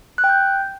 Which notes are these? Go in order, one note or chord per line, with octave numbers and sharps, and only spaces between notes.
F#6
G5
G6